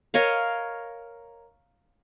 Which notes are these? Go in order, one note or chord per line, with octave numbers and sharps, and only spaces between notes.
A#4 C#5 D#5 F5